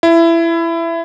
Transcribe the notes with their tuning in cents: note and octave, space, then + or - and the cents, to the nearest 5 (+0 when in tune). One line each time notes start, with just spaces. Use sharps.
E4 +20